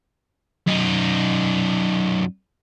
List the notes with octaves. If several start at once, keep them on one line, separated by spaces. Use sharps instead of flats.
F#2 D#4